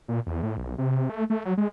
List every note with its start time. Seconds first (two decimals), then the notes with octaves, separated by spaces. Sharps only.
0.08 A#2
0.27 E2
0.43 A2
0.57 B1
0.78 C3
1.09 A3
1.30 A3
1.45 F#3
1.57 G#3